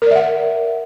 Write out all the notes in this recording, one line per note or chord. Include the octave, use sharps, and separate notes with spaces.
A#4 D5 E5 F#5